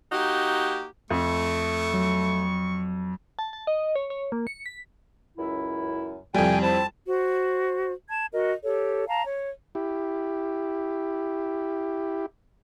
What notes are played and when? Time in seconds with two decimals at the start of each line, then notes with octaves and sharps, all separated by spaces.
0.12 A#3 D#4 F#4 G4
1.10 F2 A3 C#6
1.94 F#3
3.39 A5
3.53 A5
3.67 D#5
3.96 C#5
4.10 C#5
4.32 A#3
4.47 C#7
4.66 B6
5.38 C#2 F#2 E4
6.34 F2 A2 C3 G3 G5 G#5
6.62 C4 E4 A5
7.08 F#4 C5
8.10 A5 G#6
8.32 F#4 A#4 D#5
8.64 G4 A4 C#5
9.08 F5 A5 A#5
9.25 C#5
9.75 E4 G4